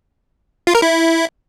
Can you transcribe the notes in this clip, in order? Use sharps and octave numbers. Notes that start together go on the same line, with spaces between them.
F4
A#4
E4